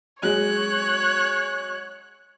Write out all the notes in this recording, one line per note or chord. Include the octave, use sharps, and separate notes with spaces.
F#3 G#3 C#5 F#6